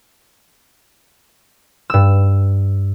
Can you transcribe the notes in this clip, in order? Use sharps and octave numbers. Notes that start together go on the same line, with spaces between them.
G2 E6